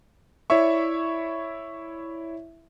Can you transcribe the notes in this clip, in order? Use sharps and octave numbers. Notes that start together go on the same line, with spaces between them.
E4 C#5 D5 E5 C#6